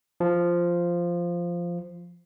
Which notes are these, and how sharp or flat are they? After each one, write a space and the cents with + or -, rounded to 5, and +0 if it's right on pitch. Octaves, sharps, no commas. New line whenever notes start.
F3 -5